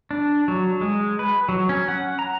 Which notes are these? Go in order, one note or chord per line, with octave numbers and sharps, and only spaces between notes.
D4
F#3
G#3
B4
F#3
C#4
F#5
A#5